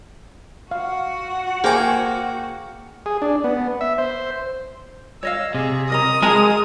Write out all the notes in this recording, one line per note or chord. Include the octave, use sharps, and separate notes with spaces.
F#4 F5 F#5
A#3 G#4 C5 G5 G#5 D6
G#4
D4
B3
E5
C5
C#5 D#5 F5 E6
C3 G#4
A#4 D#5 A#5 D#6
G#3 G#4 A#4 A5 A#5